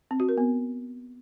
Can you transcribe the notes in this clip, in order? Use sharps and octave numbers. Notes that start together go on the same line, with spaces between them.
C4
F#4
A#4
B3